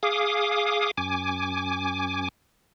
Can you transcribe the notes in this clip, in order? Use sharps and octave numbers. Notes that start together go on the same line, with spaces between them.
G#4 F5 D6 D#6
F#2 G#5 D6